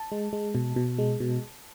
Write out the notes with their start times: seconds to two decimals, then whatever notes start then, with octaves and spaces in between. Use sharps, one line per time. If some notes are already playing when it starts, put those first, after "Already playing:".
Already playing: A5
0.12 G#3
0.33 G#3
0.55 B2
0.76 B2
0.98 G#3
1.20 B2